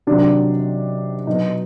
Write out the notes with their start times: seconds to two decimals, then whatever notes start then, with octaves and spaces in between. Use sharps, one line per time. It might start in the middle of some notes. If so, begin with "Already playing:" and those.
0.07 C3 D#3 F#3 D4
1.27 B2 F#3 B3 D#4